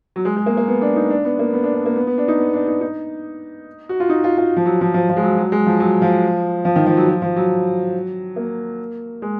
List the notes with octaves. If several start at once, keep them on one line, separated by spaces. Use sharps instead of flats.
F#3
G#3
G#3
A#3
A#3
B3
D4
D#4
D4
B3
A#3
B3
D4
D4
A#3
B3
B3
D4
D#4
B3
D4
D#4
D#4
F#4
F4
D#4
F4
F4
F3
F#3
F3
F3
F3
G#3
F#3
F#3
G#3
F3
F#3
F3
F3
D#3
F3
F#3
F3
F3
F#3
A#3
G#3